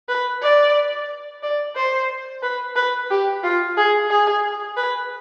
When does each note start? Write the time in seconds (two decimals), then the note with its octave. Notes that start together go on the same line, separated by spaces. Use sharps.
0.09 B4
0.42 D5
1.43 D5
1.76 C5
2.43 B4
2.76 B4
3.11 G4
3.43 F4
3.77 G#4
4.10 G#4
4.77 B4